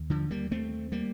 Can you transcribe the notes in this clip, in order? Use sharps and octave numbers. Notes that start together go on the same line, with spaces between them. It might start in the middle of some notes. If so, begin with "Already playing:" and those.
Already playing: D#2
D3 F3
G3 A#3
A3 C4
G3 A#3